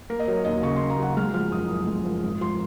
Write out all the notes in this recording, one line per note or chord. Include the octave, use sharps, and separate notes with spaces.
A#3 A#4
D#5
F#3 C#5
D#2 D#5
C#3 C#6
A#3 C6
A#5
F#3 F#5
G#3 F6
F3 F6
F#1 D#6
F#2
G#3
F3
G#1
F3 C6